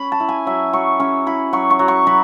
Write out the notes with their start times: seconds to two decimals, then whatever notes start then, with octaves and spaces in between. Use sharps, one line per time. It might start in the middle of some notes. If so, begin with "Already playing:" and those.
Already playing: C#4 B5
0.12 A5
0.20 E4
0.29 G#5
0.47 F#3 E5
0.73 F#3 C#6
1.00 C#4 C#6
1.27 E4 B5
1.53 F#3 C#6
1.70 C#6
1.79 F#3
1.88 C#6
2.07 F#3 B5